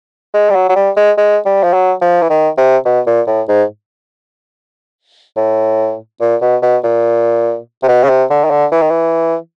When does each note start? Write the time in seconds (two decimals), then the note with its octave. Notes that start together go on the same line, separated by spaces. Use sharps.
0.34 G#3
0.50 G3
0.55 F#3
0.69 F#3
0.76 G3
0.97 G#3
1.18 G#3
1.46 G3
1.63 F3
1.73 F#3
2.02 F3
2.22 E3
2.30 D#3
2.57 C3
2.85 B2
3.07 A#2
3.27 A2
3.49 G#2
5.37 A2
6.21 A#2
6.42 B2
6.62 B2
6.84 A#2
7.83 C3
7.88 B2
8.04 C#3
8.09 C3
8.30 D3
8.45 D#3
8.51 D3
8.72 E3
8.82 D#3
8.90 E3